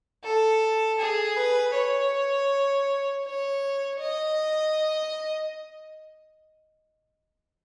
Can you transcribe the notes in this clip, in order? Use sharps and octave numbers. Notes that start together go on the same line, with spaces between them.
A4
G#4
B4
C#5
C#5
D#5